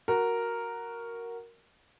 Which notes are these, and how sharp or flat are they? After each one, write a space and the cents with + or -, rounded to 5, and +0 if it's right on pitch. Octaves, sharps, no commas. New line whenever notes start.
F#4 +0 A#4 +0